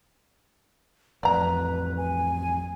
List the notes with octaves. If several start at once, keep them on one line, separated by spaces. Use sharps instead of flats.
A1 F2 B4 D5 A#5
G#5